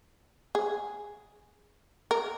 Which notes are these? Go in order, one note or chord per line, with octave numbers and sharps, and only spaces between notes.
G#4
A#4